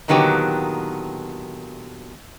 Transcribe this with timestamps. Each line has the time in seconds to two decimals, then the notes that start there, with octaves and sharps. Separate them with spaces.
0.08 A#2 D3 D#3 F#3 B3 G4